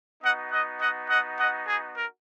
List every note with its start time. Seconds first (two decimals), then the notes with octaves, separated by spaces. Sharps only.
0.23 B3 D#4 F#4 D#5 F#5
0.51 D#5 F#5
0.80 D#5 F#5
1.09 D#5 F#5
1.38 D#5 F#5
1.67 G#4
1.95 A#4